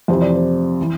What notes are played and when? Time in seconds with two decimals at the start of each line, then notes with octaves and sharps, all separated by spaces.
0.08 F2 C3 E3 C5
0.21 D5
0.35 C5
0.81 E3